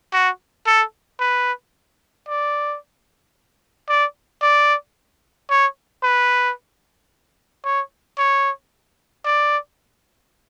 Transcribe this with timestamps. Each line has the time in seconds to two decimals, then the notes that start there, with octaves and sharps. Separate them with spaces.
0.13 F#4
0.67 A4
1.20 B4
2.28 D5
3.89 D5
4.42 D5
5.50 C#5
6.03 B4
7.65 C#5
8.18 C#5
9.25 D5